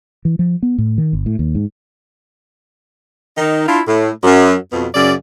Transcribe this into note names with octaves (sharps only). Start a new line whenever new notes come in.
E3
F3
B3
A2
D#3
G1
A2
D#2
G#2
D#3 D#4
D4 E4 F4
A2
F#2
F2 B2
F#2 C#3 D5